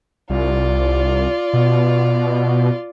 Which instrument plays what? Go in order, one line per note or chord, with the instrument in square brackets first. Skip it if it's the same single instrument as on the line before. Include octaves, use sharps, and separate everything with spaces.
[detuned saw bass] C2 [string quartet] F4 D5
[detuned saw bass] B2